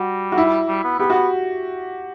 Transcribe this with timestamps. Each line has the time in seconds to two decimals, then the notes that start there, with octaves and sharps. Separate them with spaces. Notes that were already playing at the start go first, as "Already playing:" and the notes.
Already playing: G3 F#4
0.32 F#4
0.38 E4
0.68 G3
0.84 B3
0.99 B3 G4
1.10 B3 F#4